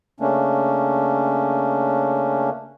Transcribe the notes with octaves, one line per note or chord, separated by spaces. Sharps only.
C#3 A3 A#3 C#4 D4